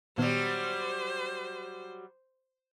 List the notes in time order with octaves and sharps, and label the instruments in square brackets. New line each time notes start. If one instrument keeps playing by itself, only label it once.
[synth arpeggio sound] A#2 D#3 B3 [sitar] F#3 G3 [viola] C5